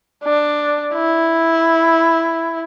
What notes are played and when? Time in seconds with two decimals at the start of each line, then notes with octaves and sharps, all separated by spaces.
0.24 D4
0.94 E4